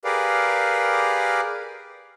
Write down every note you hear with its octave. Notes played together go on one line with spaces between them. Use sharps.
G4 G#4 A#4 B4 D5 F5